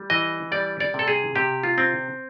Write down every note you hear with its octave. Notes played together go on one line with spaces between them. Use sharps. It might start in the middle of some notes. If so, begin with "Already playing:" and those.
Already playing: G3
E3 D#5
G3 D5
D5
C3 A4
G#4
C3 G4
F4
C4